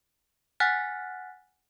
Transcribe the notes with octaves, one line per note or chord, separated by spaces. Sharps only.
F#5 G#5 F6 F#6 A6 B6